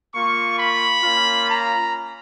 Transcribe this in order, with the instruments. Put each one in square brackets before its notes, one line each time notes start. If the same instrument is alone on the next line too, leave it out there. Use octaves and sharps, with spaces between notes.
[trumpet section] A#3 F4 C#6
B5
A#3 C#4 F4
A#5